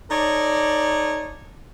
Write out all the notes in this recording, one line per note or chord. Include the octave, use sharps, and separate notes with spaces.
D#4 A4 C#5 D5